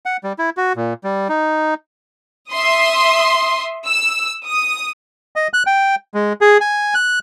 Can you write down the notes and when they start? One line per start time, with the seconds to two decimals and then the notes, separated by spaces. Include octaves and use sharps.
0.06 F#5
0.24 G3
0.38 E4
0.57 F#4
0.76 A#2
1.04 G3
1.29 D#4
2.51 E5 C6 D#6
3.86 E6
4.45 D#6
5.36 D#5
5.54 F#6
5.66 G5
6.14 G#3
6.41 G#4
6.61 G#5
6.94 F#6